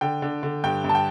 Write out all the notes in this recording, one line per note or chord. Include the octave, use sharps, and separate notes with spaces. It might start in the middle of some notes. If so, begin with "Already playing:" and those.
D3 G5
D3
D3
G2 G5
G2
A5
G5